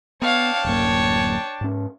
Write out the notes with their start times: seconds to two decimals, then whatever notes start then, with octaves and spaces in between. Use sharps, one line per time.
0.22 B3 D4 C#5 F5 G5 A5
0.65 D1 F#2 A#3 C#5
1.61 G#2 C#4